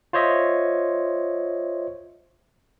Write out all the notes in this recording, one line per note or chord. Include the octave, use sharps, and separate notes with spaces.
F4 C5 C#5 D#5 E5